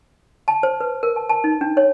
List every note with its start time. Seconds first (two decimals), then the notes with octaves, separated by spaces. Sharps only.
0.48 A5
0.63 C5
0.80 B4
1.03 A#4
1.16 A5
1.29 A5
1.44 D#4
1.61 D4
1.77 C#5